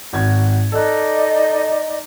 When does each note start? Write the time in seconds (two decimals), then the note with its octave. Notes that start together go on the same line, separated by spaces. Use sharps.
0.13 G#1 F#4 G#6
0.72 D#4 A4 D5 D#5 F#6